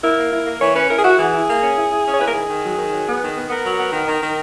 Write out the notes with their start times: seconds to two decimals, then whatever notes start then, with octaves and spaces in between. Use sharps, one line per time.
0.03 E4 A#4
0.18 A#3
0.32 E4
0.47 A#3
0.61 E3 C#5
0.76 C#4 B4
0.90 E4 A#4
0.98 G#4
1.04 E4 F#4
1.18 E3 G#4
1.33 E4
1.48 A#3
1.62 C#4
1.76 E4
1.91 E4
2.05 C#4
2.13 C#5
2.19 E4 B4
2.27 A#4
2.34 D#3 G#4
2.49 D#3
2.63 F#3
2.77 D#3
2.92 F#3
3.06 B3
3.21 D#3
3.35 B3
3.50 B3 A#4
3.64 F#3
3.79 B3
3.92 D#3
4.08 D#3
4.21 D#3